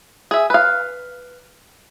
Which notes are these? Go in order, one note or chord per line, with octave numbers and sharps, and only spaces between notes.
G#4 E5
B4 F5